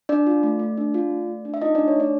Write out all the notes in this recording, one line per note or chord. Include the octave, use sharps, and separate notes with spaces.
D4 D5
F4
A3
A3
D4
F4
A3
A3
D4
E5
D#4 F4 D#5
A3 D4 D5
C#5
A3 D4 D5